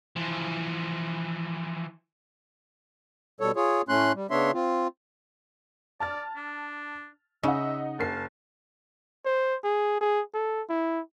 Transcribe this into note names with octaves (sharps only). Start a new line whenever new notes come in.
E3 F3
B2 G3 A4 C#5
F4 G#4 C#5
A2 A3 C#4 C6 F#6
G3
C#3 B3 D4 C#5 E5 C6
C4 F4
D5 A5 F6 A6
D4
C#3 D#4 E5 F#5
F#1 A#4 A5 C7
C5
G#4
G#4
A4
E4